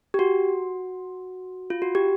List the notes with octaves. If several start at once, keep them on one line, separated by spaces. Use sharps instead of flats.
G4
F#4
F4
F#4
G4